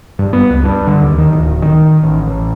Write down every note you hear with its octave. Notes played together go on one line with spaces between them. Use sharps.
G2
B3
C#2
G2
D3
D#2
D#3
D1
D#3
A1
A1